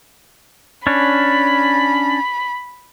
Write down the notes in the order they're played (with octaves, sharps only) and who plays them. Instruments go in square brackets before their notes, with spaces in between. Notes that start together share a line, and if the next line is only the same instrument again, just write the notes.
[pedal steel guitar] C#4 D4 [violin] B5